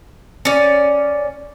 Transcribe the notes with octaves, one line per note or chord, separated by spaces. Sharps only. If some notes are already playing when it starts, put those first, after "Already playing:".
C#4 D5